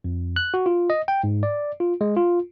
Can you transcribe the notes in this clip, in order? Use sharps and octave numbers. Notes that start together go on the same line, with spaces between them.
F2
F#6
F#4
F4
D#5
G5
G#2
D5
F4
G#3
F4